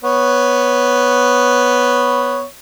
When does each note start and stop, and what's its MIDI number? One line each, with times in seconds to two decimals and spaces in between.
0.04 2.43 59
0.04 2.43 73